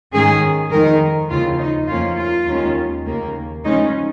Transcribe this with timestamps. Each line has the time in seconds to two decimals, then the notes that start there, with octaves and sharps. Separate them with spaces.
0.12 G#2 D#3 C#4 G#4
0.71 F2 D#3 G#3 D#4 A#4
1.30 D#2 C#3 F3 F4
1.59 D#4
1.88 F2 F3 A#3 C#4 F4
2.18 F4
2.46 D#2 D#3 G#3 C#4
3.05 D#2 C#3 A#3
3.65 C#3 F3 G#3 C#4 D#4